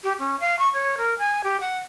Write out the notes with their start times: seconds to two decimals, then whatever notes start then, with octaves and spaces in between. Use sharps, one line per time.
0.04 G4
0.19 C#4
0.40 F5
0.59 C#6
0.74 C#5
0.98 A#4
1.19 G#5
1.44 G4
1.61 F#5